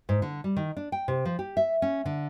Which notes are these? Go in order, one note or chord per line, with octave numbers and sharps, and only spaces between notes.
G#2
D3
G3
D#3
D4
G5
C3
F3
G4
E5
C#4
D3